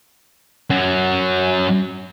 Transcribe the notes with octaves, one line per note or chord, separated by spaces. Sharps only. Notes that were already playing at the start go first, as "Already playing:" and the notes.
F#2 F#3